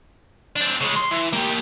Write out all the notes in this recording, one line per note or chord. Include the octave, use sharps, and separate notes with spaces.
C4 D4
C#3 G#3
C6
E3
A#3 G4